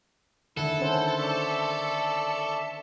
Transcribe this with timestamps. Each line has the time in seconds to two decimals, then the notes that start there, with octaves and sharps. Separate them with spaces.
0.57 D3 D#3 E4 A4 F#5
0.80 C#4 C5
1.18 D5 E5 C#6